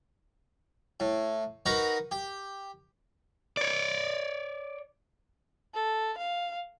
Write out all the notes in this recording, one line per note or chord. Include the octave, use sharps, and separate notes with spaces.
A2
D#4 F#4 A#4 B4
G4
C#5 D5
A4
F5